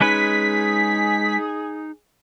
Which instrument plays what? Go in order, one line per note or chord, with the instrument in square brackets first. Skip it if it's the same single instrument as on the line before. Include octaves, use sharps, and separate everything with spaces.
[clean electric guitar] G#3 C#4 B4 [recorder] D#4 [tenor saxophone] G#4 [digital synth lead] B6